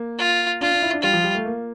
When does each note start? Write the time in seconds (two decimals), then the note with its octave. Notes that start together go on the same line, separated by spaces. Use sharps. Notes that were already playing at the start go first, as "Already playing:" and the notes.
Already playing: A#3
0.19 F4
0.61 D4 F4
0.72 D4
0.82 E4
0.93 D4
1.03 G3 F4
1.13 F3
1.24 G3
1.35 A3
1.45 A#3